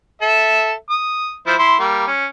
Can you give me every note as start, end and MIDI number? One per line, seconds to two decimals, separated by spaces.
0.22 0.73 69
0.22 0.73 76
0.90 1.35 87
1.47 1.54 53
1.47 1.54 64
1.47 1.54 72
1.58 1.76 64
1.58 1.76 84
1.79 2.05 55
1.79 2.05 58
2.08 2.26 61